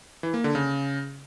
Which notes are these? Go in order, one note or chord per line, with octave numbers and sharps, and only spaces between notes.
E3
A#3
D3
C#3